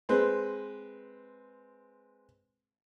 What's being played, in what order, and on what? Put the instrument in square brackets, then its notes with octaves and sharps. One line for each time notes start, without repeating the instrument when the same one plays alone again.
[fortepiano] G#3 C4 B4